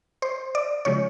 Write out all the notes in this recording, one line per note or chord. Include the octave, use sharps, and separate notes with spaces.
C5
D5
C#3 F3 G#3 C#5